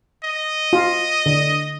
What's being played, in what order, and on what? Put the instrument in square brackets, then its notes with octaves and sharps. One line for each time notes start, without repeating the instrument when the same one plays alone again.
[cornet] D#5
[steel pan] F4
D3